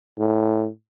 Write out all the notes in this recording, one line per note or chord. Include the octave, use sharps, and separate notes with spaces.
A2